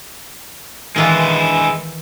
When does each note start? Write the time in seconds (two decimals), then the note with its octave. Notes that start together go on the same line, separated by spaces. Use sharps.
0.96 D#3 E3 G#3 E4 F4